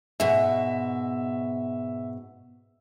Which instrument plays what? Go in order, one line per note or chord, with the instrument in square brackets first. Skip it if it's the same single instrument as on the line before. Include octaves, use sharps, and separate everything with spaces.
[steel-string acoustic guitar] G#2 B2 [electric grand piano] E5